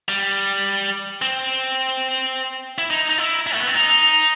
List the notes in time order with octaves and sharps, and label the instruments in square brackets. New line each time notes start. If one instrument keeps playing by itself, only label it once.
[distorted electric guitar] G3
C4
E4
D#4
D#4
E4
E4
A3
B3
C4
D#4